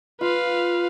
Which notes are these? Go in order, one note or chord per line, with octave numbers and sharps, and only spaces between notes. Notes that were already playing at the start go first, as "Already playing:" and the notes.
F4 B4 F5